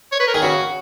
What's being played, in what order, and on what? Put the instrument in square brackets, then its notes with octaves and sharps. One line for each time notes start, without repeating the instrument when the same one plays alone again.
[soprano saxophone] C#5
B4
A#4
[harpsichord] D#3 [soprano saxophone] G#4
[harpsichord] C#3 [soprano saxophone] F#4